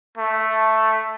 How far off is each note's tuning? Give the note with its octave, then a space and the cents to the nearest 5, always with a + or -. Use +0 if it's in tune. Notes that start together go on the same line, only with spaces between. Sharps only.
A3 +0